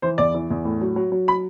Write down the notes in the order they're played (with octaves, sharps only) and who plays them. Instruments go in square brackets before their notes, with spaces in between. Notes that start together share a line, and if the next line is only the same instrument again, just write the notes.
[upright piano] E3 C5
E2 D5
E3
E2
A2
F#3
F#3
F#3
B5